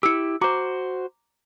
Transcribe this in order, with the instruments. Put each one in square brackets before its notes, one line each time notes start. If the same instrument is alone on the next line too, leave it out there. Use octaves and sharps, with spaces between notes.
[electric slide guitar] E4 G4 [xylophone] E6 C#7
[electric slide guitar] F#4 C5 [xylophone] A#5 D6